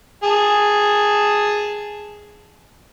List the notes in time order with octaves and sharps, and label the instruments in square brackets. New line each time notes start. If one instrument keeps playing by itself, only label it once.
[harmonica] G#4 A5